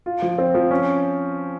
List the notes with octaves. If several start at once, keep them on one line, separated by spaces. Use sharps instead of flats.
F4
F3
C4
F3
C#4